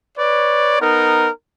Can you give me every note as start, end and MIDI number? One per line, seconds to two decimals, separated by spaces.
0.17 0.77 71
0.17 0.77 73
0.17 0.77 74
0.80 1.29 59
0.80 1.29 63
0.80 1.29 70